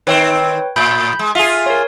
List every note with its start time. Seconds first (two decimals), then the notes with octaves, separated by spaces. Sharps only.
0.07 D#3 C4 B4 C#5 G5
0.76 A2 B5 G6
1.19 G#3
1.35 F4 G#4 E5
1.66 A#4 C#5